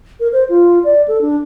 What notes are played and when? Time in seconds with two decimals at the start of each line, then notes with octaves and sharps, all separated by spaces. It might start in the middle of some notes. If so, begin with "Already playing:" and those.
0.20 A#4
0.33 C5
0.49 F4
0.84 D5
1.08 A4
1.21 D4